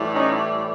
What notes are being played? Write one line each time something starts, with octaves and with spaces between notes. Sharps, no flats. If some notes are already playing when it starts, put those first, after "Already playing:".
Already playing: A2 E3 G3
C#4 D#4